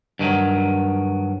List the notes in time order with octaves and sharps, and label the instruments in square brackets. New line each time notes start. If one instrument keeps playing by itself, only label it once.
[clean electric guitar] G2 D#3 F3 F#3